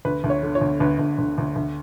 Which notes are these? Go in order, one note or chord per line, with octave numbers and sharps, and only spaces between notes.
D2 B4
D2
C#5
D3
C#5
D2
D2 B4
D2
D2
D2
D2